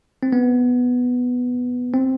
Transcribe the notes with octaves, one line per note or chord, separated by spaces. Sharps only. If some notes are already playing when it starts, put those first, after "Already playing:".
C4
B3
C4